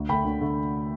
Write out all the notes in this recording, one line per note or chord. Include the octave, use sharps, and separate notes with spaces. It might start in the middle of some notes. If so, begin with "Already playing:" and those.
Already playing: D2
D3 A3 G5 B5
D2
D3 A3